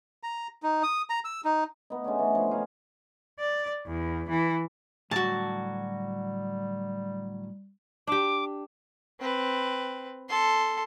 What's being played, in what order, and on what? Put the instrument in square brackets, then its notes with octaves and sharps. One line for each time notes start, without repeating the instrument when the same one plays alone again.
[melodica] A#5
D#4
D#6
A#5
E6
D#4
[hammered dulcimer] B3 D#4
G#3 A3 C#4 D4
E3
C#3 F3
D#4 F5 F#5 G#5
[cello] D5
E2
E3
[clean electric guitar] A2 D3 F#3 [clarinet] G3 [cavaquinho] F#4 A5
[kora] D4 G4 [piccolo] D6
[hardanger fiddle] C4 B4
A4 C6